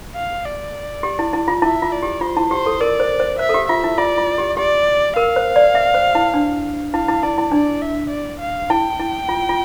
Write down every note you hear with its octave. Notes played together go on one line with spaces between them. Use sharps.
F5
D5
G4
E4
E4
F4
E4 E5
F4
D5
G4
F4 C5
E4
G4 C5
A4
A#4 D5
C5
C5
C5 E5
A4
G4
F4 E5
E4
F4 D5
F4
G4
G4 D5
A#4 F5
C5
D5
E5
C5
E4
D4
E4 F5
E4
E4 D5
E4
D4 D5
E5
D5
F5
E4 G5
E4
F4
F4